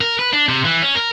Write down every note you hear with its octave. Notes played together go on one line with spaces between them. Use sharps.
A#4
B4
D4
C3
E3
C#4
A#4